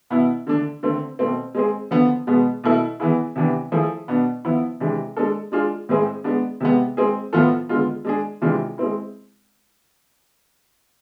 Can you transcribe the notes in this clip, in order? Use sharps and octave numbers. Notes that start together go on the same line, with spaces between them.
B2 B3 E4
D3 A3 D4
D3 A3 C4
B2 A3 C4
G#3 C4 G#4
D3 F3 B3
B2 G#3 B3
B2 A3 E4 A4
E3 B3 E4 G#4
C3 E3 B3 D4
F3 A3 E4 G#4
B2 B3 D4
F3 B3 E4
C3 E3 G#3 D4
G#3 D4 A4
G#3 D4 F4 G#4
A2 G#3 C4 G#4
G#3 B3 D4
C3 G#3 B3
G#3 C4 G#4
A2 F3 B3 F4 A4
D3 G#3 B3 F4
G#3 D4 G#4
C3 E3 G#3 D4 F4
G#3 C4 E4